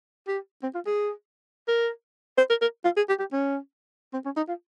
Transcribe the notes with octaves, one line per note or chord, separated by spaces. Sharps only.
G4
C4
F4
G#4
A#4
C5
A#4
A#4
F4
G#4
G4
G4
C#4
C4
C#4
D#4
F4